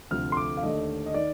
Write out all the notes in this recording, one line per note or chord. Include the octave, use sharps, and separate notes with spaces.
D2 C3 F3 A3 F6
C6
D6
F5
D#2 D3 A3 D4 D#5
D#5
D#3 D5